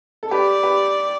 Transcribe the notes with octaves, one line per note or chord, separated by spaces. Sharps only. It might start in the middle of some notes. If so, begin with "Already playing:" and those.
A4
G4 B4 D5
G4 B4